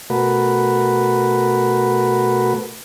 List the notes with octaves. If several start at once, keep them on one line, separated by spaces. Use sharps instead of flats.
B2 A3 F#4 A#4 B4